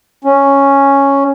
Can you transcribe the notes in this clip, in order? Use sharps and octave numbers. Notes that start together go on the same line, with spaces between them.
C#4